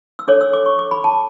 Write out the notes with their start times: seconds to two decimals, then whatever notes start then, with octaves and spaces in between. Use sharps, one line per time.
0.19 E6
0.28 D4 A4 C#5 D6
0.41 E6
0.53 D6
0.66 C#6
0.79 D6
0.91 B5
1.04 A5